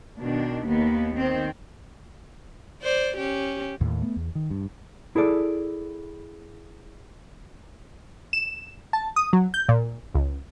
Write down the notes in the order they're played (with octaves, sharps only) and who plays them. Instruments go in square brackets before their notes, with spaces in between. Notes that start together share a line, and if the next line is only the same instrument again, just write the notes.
[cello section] B2 D#3 D4
D#2 A#3 B3
D#3 C4 C5
[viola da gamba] C5 D5
C#4 G4
[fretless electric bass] D#2 A2
A3 B3
E2
D#3
G2
[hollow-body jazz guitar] E4 G#4 A4 D5
[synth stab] E7
A5
D#6
F#3
G6
A#2
C#2